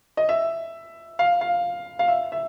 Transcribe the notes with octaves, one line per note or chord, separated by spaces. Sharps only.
D#5
E5
F5
F5
F5
E5
E5